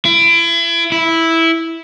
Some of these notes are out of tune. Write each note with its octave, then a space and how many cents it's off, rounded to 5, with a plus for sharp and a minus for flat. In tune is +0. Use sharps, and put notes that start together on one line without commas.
E4 +35
E4 -5